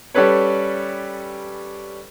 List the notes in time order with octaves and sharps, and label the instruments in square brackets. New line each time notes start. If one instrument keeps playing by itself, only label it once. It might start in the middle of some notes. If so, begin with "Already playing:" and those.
[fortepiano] G3 C#4 A4 B4 C#5